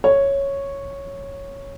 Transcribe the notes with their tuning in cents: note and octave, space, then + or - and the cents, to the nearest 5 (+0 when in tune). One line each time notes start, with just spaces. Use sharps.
C#5 -5